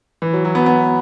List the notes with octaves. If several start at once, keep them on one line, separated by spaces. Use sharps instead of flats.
E3
F#3
F#3
B3
B3